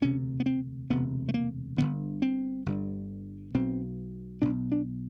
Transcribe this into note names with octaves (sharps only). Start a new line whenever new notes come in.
E1 D2 C3 C#4
B3
C4
E1 D2 C3 B3
A3
A#3
G1 G2 D3 B3
C4
G1 G2 D3
B1 B2 C4
B1 B2 D4
D4